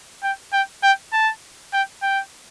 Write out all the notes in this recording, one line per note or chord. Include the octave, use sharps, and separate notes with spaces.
G5
G5
G5
A5
G5
G5